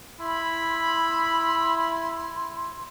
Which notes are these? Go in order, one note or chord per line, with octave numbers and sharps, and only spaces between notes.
E4 B5 C6